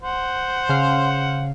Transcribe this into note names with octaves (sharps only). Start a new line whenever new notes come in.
C5 F#5
C#3 F5